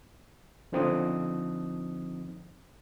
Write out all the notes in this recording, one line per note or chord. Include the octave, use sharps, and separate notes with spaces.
C#2 D3 F3 C4 D#4 D#6